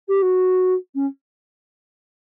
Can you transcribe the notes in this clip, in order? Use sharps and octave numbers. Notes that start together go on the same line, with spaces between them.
G4
F#4
C#4